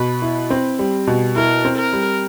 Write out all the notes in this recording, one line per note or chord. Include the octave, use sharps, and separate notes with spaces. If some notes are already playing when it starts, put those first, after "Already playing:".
Already playing: B2 B4
E4
C4
G3
B2
E4 A#4
C4
A#4
G3